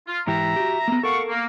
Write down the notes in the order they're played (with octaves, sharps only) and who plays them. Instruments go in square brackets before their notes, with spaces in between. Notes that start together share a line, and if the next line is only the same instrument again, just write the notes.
[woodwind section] F4
[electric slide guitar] G#2 E3 G4 [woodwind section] E5 A#5
[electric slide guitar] F#4 G4
A#3 B3
[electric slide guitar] A4 A#4 [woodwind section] F5 F#5 C#6
[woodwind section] A#3